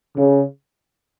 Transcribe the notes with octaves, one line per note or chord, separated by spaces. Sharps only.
C#3